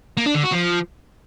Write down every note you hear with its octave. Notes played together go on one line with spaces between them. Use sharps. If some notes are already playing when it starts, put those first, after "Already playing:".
A#3
D4
D3
F#4
F3